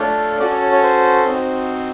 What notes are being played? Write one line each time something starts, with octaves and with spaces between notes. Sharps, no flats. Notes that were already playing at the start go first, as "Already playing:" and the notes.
Already playing: A3 D4 F4 A4 C#5
C#4 F#4 A4 D5
C#5
C#5
C#5
C5
C4 D#4 F#4